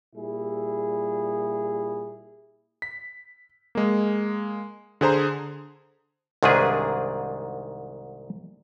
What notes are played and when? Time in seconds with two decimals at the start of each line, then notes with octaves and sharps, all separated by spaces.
0.15 A#2 G3 E4 G#4
2.82 B6
3.75 G#3 A#3
5.01 D3 G#4 C5 A#5
6.43 C2 G#2 D#3 D4 G#4 B4